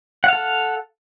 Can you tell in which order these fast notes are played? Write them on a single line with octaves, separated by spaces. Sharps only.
F#5 F5 A4